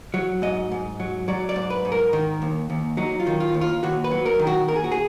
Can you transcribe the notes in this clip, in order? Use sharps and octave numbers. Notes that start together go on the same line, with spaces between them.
F#3
G#2 D#5
G#2
F#3
F#3 D5
D5
G#2
B4
G#2
A#4
D#3
D#2
D#2
F#3 D#4
F4
D#3
F4
D#2
F4
D#2 F#4
B4
F#3
A#4
D#3
F#4
D#2 A#4
G#4
F#4
G#4